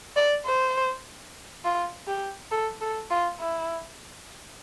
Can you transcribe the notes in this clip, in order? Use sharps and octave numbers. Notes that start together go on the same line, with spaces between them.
D5
C5
F4
G4
A4
A4
F4
E4